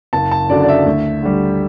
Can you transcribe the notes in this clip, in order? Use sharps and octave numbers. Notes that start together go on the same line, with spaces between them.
F#1 A5
A5
F#2 D3 F#3 D5
D5
E5
D2
D3 G3